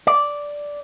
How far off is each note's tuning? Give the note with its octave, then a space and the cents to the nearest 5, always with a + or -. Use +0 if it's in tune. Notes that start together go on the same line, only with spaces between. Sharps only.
D5 -5